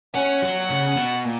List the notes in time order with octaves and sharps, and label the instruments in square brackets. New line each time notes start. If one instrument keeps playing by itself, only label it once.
[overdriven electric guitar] C#4 [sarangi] F#5
[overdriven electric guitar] F#3
C#3
B2
A#2